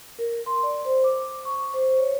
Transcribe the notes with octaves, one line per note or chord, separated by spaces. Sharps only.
A#4
C6
D5
C5
D6
C#6
C5
C#5